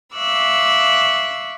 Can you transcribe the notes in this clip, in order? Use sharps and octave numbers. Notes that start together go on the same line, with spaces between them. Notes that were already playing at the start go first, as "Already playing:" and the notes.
E5 F5 C#6 D6 E6 F#6